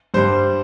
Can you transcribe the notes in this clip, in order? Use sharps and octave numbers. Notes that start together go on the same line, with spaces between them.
G2 G3 C5